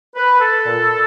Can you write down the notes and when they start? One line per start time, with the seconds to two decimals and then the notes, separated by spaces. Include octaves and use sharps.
0.16 B4
0.40 A4
0.65 A#2